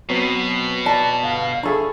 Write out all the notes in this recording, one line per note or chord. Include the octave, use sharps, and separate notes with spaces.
B2 F#3 B3 C4
D5 A5 A#5
G1 F5 F#5
D4 G#4 A4 E5 B5 C#6